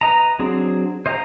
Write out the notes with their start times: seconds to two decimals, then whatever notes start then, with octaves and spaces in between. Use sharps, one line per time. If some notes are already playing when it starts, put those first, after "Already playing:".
0.01 B4 D#5 A#5
0.39 F#3 C4 D4 G#4
1.06 C5 D#5 F5 G5 A#5